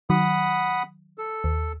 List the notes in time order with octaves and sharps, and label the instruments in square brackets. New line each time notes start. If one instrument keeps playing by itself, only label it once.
[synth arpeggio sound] D#3 F#3 [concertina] F#5 B5 D#6
[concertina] A4
[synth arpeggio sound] D#2